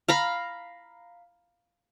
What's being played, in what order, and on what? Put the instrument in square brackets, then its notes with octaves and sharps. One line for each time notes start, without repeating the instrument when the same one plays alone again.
[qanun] F5 A#5 B5